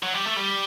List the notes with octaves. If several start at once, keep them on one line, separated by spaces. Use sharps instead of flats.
F#3
G3
A3
G3